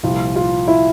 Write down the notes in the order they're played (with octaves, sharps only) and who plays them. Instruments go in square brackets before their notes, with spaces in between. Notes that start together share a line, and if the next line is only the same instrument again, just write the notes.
[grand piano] C2 A#2 F3 F4
F4
E4